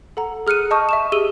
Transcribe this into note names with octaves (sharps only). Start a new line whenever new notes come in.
A4 F#5 A#5
G#4 F6 F#6 C#7 D#7
D#5 A5 C#6 D#6 G6
E5 C#6 E7
G4 G#4 E6 D#7 G7